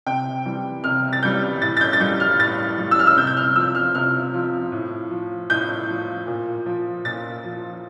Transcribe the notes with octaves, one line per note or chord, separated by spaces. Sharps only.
C3 G5
E3 G3
C3 F6
A6
E3 G3 G6
A2 A6
A6
G6
A6
G3 G6
F6
A2 A6
G3
E6
F6
E6
C3 G6
G6
F6
F3 E6
F6
C3 F6
F3
A2
F3
A2 G6
F3
A#2
F3
A#2 A6
F3